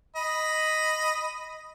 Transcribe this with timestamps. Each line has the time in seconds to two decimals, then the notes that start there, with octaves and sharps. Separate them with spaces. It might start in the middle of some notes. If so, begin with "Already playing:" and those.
0.16 D#5 B5